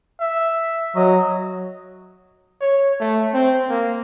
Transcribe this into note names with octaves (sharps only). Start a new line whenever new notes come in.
E5
F#3 D#5
C#5
A3
C4
A#3